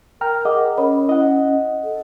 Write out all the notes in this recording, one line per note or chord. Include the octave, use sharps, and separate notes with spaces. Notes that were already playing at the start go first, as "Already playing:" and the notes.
A#4 G5 A#5 F6
G#4 D#5 F#5 D6
C#4 A#4 C#5 B5
E4 D#5 F#5
A4